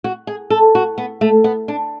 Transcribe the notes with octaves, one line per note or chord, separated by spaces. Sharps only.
F#4
G#4
A4
F#4
B3
A3
B3
D4